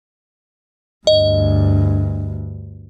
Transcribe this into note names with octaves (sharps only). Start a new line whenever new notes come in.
D2 G2 D#5